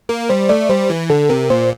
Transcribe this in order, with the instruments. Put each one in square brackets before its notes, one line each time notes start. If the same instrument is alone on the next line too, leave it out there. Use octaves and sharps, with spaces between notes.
[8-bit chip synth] A#3 [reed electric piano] A#4
[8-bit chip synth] G3 [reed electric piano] C5
[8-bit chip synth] A3 [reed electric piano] D5
[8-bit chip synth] G3 [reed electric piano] C5
[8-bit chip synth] E3
[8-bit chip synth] D3 [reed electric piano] A4
[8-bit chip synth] C3 [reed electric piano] A#4
[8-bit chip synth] A#2 [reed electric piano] C5